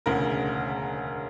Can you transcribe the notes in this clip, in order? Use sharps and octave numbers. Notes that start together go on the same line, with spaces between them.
E1 D2 C#3 A#4